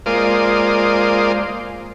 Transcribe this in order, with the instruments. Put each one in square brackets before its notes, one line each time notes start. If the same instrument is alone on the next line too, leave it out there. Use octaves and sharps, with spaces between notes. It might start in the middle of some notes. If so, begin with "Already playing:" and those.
[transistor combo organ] G#3 A#3 F4 C5 D5 D#6